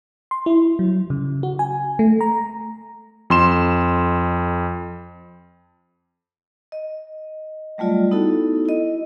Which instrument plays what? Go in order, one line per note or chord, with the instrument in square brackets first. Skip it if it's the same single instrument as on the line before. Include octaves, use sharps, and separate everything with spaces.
[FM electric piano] C6
E4
F#3
C#3
F#4
G#5
A3
A#5
[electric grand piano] F2 C6 E7
[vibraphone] D#5
F#3 G3 A3 F4 D5
B3 D#4 E4 F#4 A4
E4 D#5